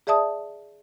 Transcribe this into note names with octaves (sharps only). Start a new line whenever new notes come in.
G#4 D5 E5 A5 D#6